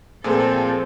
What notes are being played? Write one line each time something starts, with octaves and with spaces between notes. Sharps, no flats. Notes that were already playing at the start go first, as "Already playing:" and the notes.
A#2 F3 A3 C4 G#4 A4 C5